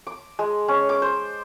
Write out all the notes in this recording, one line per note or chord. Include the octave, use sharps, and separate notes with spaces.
D6
G#3
C#4
D6
C5